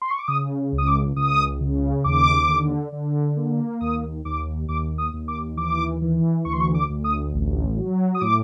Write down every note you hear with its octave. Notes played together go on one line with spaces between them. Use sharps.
C6
C#6
D6
C#3 D#6
C#2
D#6
D6
C#2 D#6
C#3
D#2 D6
D3
D3
A#3
D#2 D#6
D#2 D6
D#2 D6
D#6
D#2
D6
E3 D6
E3
D2 C#6
C6
C#6
D6
D2
D#6
A1
F#3
D#6
A2 D6